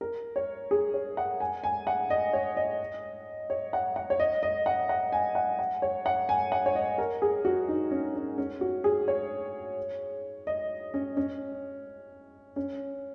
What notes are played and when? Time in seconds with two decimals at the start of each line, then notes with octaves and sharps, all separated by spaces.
0.01 A#4
0.36 C#5
0.71 G#4
0.94 C#5
1.17 F#5
1.40 G#5
1.64 G#5
1.87 F#5
2.10 D#5
2.33 C#5
2.57 D#5
3.50 C#5
3.73 F#5
3.96 F#5
4.10 C#5
4.20 D#5
4.43 D#5
4.66 F#5
4.89 F#5
5.12 G#5
5.35 F#5
5.59 F#5
5.82 C#5
6.06 F#5
6.29 G#5
6.52 F#5
6.66 C#5
6.75 D#5
6.98 A#4
7.22 G#4
7.45 F#4
7.68 D#4
7.91 C#4
8.15 C#4
8.38 C#4
8.61 F#4
8.84 G#4
9.08 C#5
10.47 D#5
10.94 C#4
11.17 C#4
12.56 C#4